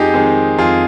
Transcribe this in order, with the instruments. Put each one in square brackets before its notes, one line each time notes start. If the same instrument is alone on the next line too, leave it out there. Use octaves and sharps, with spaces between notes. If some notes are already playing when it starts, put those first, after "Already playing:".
Already playing: [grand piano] F2 D#4 G4 G#4
D#3 G#3 C4
F2 F4 G#4